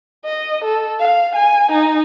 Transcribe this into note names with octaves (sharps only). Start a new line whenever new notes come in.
D#5
A4
F5
G#5
D#4